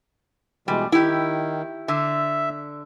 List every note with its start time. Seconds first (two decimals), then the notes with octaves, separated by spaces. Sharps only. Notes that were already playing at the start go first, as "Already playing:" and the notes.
0.68 B2 E3 G3 G#3
0.92 D#3 E4 G4
1.88 D3 E5